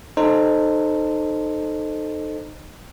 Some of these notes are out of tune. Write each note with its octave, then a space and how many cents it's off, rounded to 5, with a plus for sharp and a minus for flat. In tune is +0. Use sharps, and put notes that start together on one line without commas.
D#4 -20 A4 +0 C5 +0